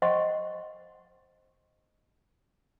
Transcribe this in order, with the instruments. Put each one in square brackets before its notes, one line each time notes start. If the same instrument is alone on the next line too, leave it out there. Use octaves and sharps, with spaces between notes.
[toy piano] C5 D#5 F#5 C6 C#6